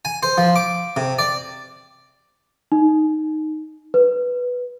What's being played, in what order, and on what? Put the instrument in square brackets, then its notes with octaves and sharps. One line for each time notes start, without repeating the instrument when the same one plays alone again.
[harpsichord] G#5
C5
F3
D6
C3
D5
[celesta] D#4
B4